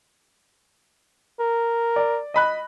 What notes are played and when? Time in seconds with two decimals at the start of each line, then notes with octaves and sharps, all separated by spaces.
1.40 A#4
1.96 D5
2.34 D#5 B5 F#6